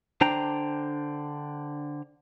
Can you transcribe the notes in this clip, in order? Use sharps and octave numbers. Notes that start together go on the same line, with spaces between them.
D3 D4 C5 G5 A#5